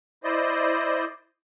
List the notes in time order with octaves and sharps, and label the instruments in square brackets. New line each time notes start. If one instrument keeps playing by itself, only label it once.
[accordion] E4 C5 D5 D#5